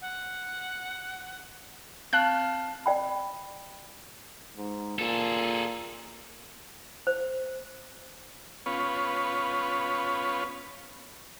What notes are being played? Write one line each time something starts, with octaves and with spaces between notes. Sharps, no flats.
F#5
C4 F5 A5 F6 F#6
D5 G5 B5
G#2
A#2 G#4 A4
C5
B3 C#4 F4 B4 C#5